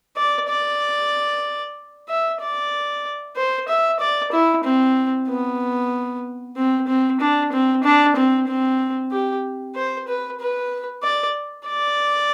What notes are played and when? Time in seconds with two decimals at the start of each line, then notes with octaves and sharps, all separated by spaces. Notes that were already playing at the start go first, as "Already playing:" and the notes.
0.16 D5
0.49 D5
2.09 E5
2.41 D5
3.36 C5
3.68 E5
4.00 D5
4.32 E4
4.64 C4
5.28 B3
6.57 C4
6.88 C4
7.20 D4
7.52 C4
7.84 D4
8.16 C4
8.47 C4
9.12 G4
9.75 C5
10.08 B4
10.40 B4
11.03 D5
11.67 D5